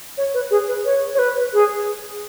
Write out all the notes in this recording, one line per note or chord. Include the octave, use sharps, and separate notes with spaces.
C#5
B4
G#4
B4
C#5
C#5
B4
G#4